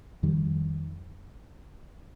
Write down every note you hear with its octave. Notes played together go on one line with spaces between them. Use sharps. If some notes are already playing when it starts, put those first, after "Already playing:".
F2 D#3 G3